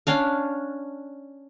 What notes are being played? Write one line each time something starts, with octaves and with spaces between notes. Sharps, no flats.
C#4 D4 F5